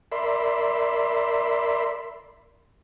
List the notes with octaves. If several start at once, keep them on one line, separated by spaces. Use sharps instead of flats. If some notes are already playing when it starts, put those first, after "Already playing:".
A#4 D5 E5 B5 C6